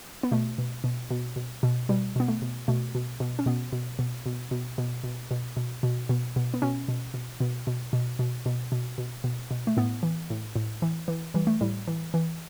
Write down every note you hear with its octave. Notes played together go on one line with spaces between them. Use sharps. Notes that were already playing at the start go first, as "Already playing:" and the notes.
B3
B2 A3
B2
B2
B2
B2
B2
B2 G3
B2 B3
A3
B2
B2 A3
B2
B2
C#4
B2 B3
B2
B2
B2
B2
B2
B2
B2
B2
B2
B2
B2
B3
B2 C#4
B2
B2
B2
B2
B2
B2
B2
B2
B2
B2
B2
A3
A2 B3
E3
A2
A2
E3
E3
E3 G3
A3
A2 G3
E3
E3